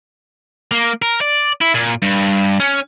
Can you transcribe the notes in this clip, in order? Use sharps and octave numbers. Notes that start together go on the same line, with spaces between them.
A#3
A#4
D5
E4
A#2
G2
C#4